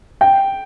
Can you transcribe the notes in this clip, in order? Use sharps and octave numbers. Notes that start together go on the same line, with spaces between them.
G5